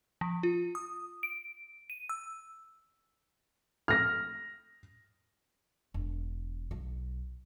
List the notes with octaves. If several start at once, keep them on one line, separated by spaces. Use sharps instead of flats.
F3
F4
D#6
D7
D#7
E6
F6 A#6
E1
B1